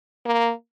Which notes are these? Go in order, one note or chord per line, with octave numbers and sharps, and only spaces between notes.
A#3